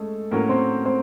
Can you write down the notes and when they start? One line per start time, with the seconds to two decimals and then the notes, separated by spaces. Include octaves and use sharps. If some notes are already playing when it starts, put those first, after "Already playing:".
Already playing: G#3 A3 C#4 G#4 A4
0.31 A2 F#3 A#3 C#4 A#4
0.49 C4 C5
0.86 C4 C5